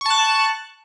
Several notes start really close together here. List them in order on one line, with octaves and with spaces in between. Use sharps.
C#6 A5 F#6